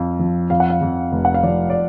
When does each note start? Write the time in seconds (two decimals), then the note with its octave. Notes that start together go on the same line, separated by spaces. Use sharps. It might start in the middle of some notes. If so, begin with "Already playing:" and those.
Already playing: F2 F5
0.19 F3
0.50 F2 F5
0.60 F#5
0.70 F5
0.81 F2
1.12 F1
1.25 F#5
1.34 F5
1.43 F3 D5
1.70 D5